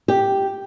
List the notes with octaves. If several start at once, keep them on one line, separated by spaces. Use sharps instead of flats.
G4